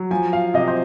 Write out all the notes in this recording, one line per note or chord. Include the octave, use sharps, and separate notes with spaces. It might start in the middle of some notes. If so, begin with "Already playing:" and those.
Already playing: F#3
F3 G#5
F5
C3 D#5
C5